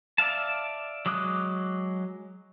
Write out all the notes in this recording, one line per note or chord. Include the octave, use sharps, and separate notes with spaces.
D5 E5 F5 A5
F#3 G#3 D6 D#6 F#6